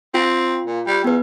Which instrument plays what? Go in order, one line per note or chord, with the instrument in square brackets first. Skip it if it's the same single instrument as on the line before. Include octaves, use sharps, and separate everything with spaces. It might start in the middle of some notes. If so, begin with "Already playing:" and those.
[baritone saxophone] C4 [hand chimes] F4
[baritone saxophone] A#2
G3
[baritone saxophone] E2 [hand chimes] B3 B4